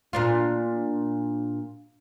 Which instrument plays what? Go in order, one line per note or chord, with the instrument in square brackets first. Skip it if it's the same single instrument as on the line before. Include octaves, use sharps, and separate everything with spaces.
[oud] A#2 D4 F4